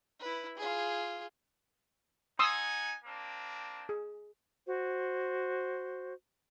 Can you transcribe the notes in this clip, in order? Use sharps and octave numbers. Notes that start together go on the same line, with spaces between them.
E4 B4
F4 G#4
D#4 F#5 G#5 C6 D#6 E6
A#3 C4 D4
G#4
F#4 C5